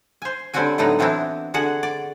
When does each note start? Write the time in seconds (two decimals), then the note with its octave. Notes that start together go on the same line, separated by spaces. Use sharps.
0.22 C5 G#5
0.54 D3 G3 C4 C#4 F#4 G#5
0.78 A2 D3 F#3 B3 D#4
0.99 E3 B3 C4 D4 E4
1.54 D3 F#4 G#4 F#5
1.83 D5